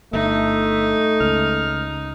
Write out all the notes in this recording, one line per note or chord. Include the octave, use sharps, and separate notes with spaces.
G1 A3 D#4 E5
C#2 F6